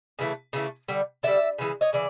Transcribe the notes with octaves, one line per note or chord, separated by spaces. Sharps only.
C#3 E3 A3
C#3 E3 A3
D3 G3
D3 G3 D5 E5
C#3 E3 G#3
C#5 D#5
C#3 E3 D5